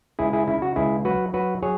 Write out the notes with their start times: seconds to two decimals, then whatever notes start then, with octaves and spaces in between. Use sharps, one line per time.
0.19 C#2 E4 G#4
0.33 E4 G#4
0.47 C#3 E4
0.62 F#4
0.76 C#2 E4 G#4
1.05 F#3 F#4 B4
1.34 F#3 F#4 B4
1.63 F#3 G#4 C#5